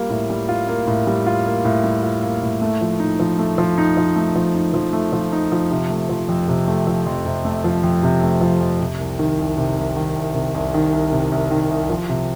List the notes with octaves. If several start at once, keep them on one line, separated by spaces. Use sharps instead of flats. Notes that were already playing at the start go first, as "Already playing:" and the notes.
Already playing: G3 A#3 F4
A2
G3
F4
A#3
A2
G3
F4
A#3
A2
G3
F4
A#3
A2
A3
F3
D#4
F3
A3
F3
D#4
F3
A3
F3
D#4
F3
A3
F3
D#4
F3
C3
A3
F3
F2
C3
A3
F3
F2
C3
A3
F3
F2
C3
A3
F3
F2
C3
C2
D#3
C2
C3
C2
D#3
C2
C3
C2
D#3
C2
C3
C2
D#3
C2
F3
C3